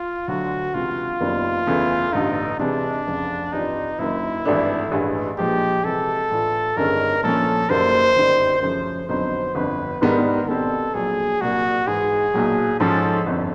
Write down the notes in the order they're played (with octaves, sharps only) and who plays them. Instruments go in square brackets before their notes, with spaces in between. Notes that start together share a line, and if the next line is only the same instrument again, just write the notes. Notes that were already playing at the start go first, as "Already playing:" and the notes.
Already playing: [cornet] F4
[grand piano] D2 D3 F#3 [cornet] F#4
[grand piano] C#2 C3 E3 [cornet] F4
[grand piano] F#1 F#2 D#3 G3 B3
E2 C#3 E3 A3
[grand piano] A1 G2 D3 [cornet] D#4
[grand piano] C3 E3 G#3 [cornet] D4
[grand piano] F1 F2 C#3
[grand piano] G2 E3 G3 C4 F4 [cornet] D#4
[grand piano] F#1 F#2 D#3 [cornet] E4
[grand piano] G#1 G2 E3 A3 D4
A1 G2 E3 G#3
[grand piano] A#2 F3 G#3 [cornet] G4
[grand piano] C3 E3 G#3 [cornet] A4
[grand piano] A2 E3 A3 D4 F4
[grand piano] G1 G2 D#3 G#3 C#4 [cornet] A#4
[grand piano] A#2 F3 A3 C#4 [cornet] A4
[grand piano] F#1 F#2 D#3 G3 A#3 [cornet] C5
[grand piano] G1 F#2 D#3 G3
[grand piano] F#2 C#3 F3 A3 C#4 [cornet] C5
[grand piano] F2 D3 F#3 B3 D#4 [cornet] C5
[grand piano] G1 F2 D3 [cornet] B4
[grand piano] G#2 D#3 G3 B3 D4 [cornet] A#4
[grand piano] B2 G3 C4 [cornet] A4
[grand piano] A#1 A#2 F#3 [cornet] G#4
[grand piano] C2 A#2 F#3 A#3 D4 [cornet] F#4
[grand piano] G#2 E3 G#3 [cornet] G#4
[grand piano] B1 A#2 F#3
[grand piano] G#2 F3 G#3 C#4 [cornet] A4
[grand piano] G1 F2 D3